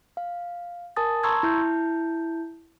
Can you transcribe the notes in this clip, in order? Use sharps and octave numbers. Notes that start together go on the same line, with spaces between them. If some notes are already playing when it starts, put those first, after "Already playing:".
F5
A#4 G#5 A5 D#6 A6
A5 A#5 C6 C#6 E6 G#6
E4 A5 G6